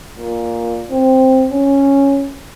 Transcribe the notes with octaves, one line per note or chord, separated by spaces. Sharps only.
A#2
C4
C#4